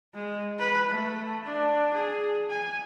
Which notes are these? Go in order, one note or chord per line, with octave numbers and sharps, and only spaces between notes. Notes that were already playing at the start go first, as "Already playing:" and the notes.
G#3
B4
A3
D4
G#4
G#5